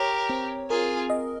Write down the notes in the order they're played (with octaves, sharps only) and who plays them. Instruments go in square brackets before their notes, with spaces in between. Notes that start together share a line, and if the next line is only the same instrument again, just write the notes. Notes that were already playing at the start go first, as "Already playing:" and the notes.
Already playing: [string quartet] G4 A#4 [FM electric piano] C#5
[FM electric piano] C4
[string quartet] F4 G#4 [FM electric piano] A#4
[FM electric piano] D#5